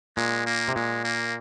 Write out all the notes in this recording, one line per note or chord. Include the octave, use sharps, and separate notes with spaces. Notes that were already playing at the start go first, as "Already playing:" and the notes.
A#2 G#3
A#3
C3
A#2 G#3
A#3